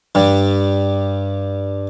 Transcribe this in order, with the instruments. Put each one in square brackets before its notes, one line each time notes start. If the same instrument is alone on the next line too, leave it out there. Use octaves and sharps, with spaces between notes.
[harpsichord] G2 G3